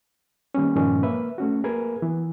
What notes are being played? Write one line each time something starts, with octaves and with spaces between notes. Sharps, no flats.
D#3 G3 A#3 B3 C#4
G2 A#2 D#3 F3 G#3 C#4
A#3 B4 E5
A3 C#4 F#4
A#3 G#4 A#4 B4 G#6
E3 B3